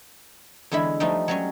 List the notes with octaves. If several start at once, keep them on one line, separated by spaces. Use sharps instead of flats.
E2 D3 G#3 E4 B5
F3 G3 A3 D#4
F#3 G3 C#4